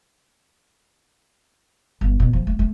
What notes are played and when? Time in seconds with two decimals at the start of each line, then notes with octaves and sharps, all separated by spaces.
2.01 G1
2.20 B2
2.33 F3
2.47 A3
2.59 A3